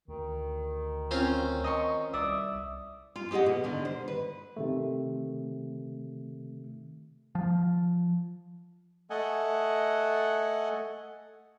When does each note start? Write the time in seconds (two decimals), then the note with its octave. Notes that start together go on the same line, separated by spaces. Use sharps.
0.08 D2 D#3
1.11 C4 C#4 F4
1.64 D#5 C6 C#6
2.13 C2 D5 E5 D#6
3.16 F4
3.31 G4 G#4 D5 D#5 F#5
3.46 B2
3.64 D3 D#3
3.85 C5
4.08 B4
4.57 C3 D#3 A3
7.35 F3
9.10 A3 A4 D#5 F#5 G#5